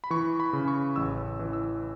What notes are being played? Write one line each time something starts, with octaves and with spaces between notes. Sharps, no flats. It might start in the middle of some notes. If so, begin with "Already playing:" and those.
B5
E3 C#6
B5
C#3
C#6
A1 E6
E3
E6